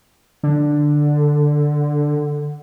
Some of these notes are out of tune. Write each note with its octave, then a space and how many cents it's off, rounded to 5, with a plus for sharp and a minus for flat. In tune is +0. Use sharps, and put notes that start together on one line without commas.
D3 +5